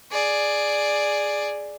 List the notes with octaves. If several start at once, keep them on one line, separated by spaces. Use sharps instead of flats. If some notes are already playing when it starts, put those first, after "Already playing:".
G#4 D5